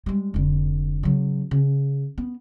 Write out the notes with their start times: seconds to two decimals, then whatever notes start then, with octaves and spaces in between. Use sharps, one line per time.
0.06 G3 G#3
0.34 F1 D3
1.03 C#3 F#3
1.51 C#3
2.18 B3